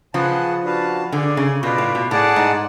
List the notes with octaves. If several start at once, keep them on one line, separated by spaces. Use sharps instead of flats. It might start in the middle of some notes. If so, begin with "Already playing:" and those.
C#3 F3 G#4 B4 F#5 A5
D4 F#4 B4 F5 A5
D3 G#4 D5 G#5
C#3
B2 F4 B4 D5
A2
B2
A2 G#4 D5 F#5 A5
G#2